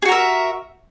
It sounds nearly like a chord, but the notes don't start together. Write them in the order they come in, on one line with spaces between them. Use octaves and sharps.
G#4 F#4 A#4 E5